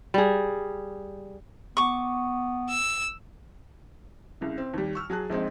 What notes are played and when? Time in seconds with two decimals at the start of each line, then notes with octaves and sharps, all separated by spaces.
0.14 G3 G#4
1.77 B3 C#6 D6
2.70 E6
4.41 C2 C#3
4.58 C4
4.74 D#2 G3
4.95 C#6 E6 F6
5.10 F#3 G#4 A5 F#6
5.30 A#1 G#3 C4 D#4